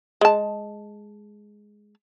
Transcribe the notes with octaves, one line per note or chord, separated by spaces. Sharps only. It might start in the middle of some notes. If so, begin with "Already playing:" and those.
G#3 A5